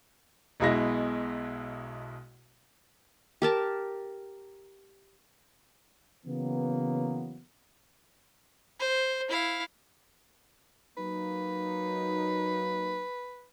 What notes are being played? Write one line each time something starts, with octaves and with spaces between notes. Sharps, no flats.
B1 B2 G#3 E4 A#6
G4 A#4 A5
C#3 E3 F#3 A#3 B3
C5
E4 F5
F#3 A#3 D#4 B4